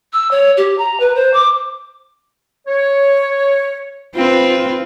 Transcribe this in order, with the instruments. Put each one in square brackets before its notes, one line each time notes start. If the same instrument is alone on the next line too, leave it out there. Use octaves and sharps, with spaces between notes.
[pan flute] E6
C#5
G4
A#5
B4
C5
D6
[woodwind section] C#5
[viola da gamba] C4 B4 [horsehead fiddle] F4